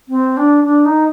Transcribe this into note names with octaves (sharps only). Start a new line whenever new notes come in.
C4
D4
D4
D#4